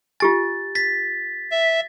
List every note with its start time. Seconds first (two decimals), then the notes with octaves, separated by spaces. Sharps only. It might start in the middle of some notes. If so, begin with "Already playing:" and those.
0.20 F4 G4 G#5 A6
0.75 A6 B6
1.51 E5